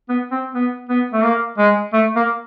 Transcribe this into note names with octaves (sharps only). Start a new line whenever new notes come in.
B3
C4
B3
B3
A3
A#3
G#3
A3
A#3